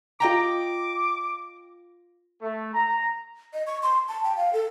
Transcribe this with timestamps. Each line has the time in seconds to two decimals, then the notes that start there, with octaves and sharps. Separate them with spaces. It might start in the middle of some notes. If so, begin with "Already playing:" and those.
0.20 F4 D#5 G5 A#5 D6 A#6
2.41 A3
2.74 A#5
3.53 D#5
3.67 C#6
3.83 C6
4.08 A5
4.24 G5
4.37 F5
4.53 A4